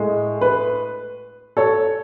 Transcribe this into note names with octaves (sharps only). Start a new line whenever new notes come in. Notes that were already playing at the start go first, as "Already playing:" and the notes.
Already playing: A2 G#3
B4
A4 C#5